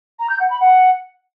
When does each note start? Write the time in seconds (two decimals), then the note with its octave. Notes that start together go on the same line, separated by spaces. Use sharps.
0.19 A#5
0.29 G6
0.40 F#5
0.50 B5
0.60 F#5